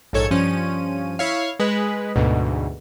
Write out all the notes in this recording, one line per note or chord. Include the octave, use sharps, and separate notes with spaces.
A#1 G#2 A4 C#5 G#6
G2 F3 C#4 D#7
E4 C#5 F5
G#3 B4
D2 G#2 B2